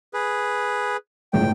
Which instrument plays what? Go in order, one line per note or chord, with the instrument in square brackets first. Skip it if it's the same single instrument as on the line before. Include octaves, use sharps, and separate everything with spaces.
[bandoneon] G#4 B4
[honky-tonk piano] G1 C#2 A2 [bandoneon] G5